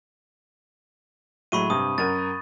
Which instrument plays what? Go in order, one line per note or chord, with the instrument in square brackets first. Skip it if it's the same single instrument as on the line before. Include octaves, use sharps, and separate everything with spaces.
[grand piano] A2 F#3 G#3 [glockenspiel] B5 C#6 D#7
[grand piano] G2 C3 [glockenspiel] D#6
[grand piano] F#2 A#4 D#7 [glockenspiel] A6